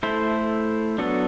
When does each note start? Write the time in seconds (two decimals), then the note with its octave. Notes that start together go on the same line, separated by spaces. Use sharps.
0.03 A3 E4 A4 C5
0.98 F#3 B3 D4 F#4 A4